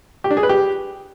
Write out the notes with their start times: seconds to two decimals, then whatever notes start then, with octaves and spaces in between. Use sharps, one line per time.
0.24 G4
0.31 D4
0.37 G#4
0.43 B4
0.49 G4